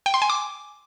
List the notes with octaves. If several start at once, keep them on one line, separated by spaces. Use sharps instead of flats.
G5
C6
G#5
D6